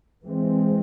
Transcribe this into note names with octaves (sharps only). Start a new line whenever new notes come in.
E3 G#3 C4